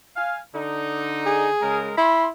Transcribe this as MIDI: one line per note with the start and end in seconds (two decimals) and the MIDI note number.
0.16 0.40 77
0.16 0.40 80
0.55 1.49 50
0.55 1.49 63
1.26 1.80 68
1.62 1.92 49
1.62 1.92 56
1.62 1.92 70
1.98 2.29 64
1.98 2.27 83
1.98 2.27 84